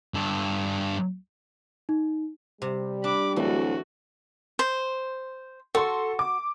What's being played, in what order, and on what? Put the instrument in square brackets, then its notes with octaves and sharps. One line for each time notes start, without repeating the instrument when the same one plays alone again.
[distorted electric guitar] G2 A4
[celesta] D#4
[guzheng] C3 [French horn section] G3
[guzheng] D4 [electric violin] B5 D6
[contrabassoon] D1 [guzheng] E3 [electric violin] A3 F#4
[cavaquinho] C5
[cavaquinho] F#4 [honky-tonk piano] A4 C6
[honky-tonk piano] D6